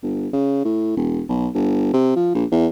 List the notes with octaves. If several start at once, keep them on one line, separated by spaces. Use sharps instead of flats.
G1
C#3
A2
E1
B1
G1
C3
F3
A#1
E2